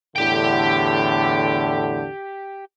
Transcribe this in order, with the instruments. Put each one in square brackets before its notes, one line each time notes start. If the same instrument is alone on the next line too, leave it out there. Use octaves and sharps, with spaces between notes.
[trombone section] E2 A2 D3 [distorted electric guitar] G4 G5